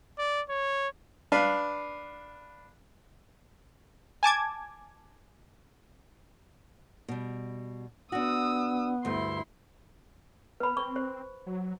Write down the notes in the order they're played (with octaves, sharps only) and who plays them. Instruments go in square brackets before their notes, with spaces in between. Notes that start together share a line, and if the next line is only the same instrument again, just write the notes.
[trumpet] D5
C#5
[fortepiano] D4 B4 F5 B5
[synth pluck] G#5 A5 D6 G#6
[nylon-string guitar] B2 G3
[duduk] B3 [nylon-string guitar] D4 F#4 [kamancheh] D#6 E6
[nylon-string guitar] D2 G2 [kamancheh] E4 C6
[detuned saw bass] B3 [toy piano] B4 B5
[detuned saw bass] C4 [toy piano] C#6
[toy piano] C5
[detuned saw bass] F#3